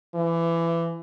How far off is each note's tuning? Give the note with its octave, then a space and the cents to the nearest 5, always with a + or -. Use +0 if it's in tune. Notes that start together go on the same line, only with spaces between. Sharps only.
E3 +25